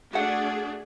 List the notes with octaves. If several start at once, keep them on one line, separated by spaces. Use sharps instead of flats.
A3 D4 F#4 G#4 A4 F#5